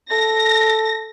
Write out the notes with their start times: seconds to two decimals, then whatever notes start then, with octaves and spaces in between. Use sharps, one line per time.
0.11 A4 A#6